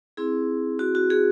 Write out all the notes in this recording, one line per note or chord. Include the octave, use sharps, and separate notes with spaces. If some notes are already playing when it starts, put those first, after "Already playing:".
C4 E4 G#4
F#4
F#4
G#4